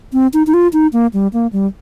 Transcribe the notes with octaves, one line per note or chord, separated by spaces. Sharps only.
C4
D#4
D#4
F4
D#4
A#3
G3
A#3
G3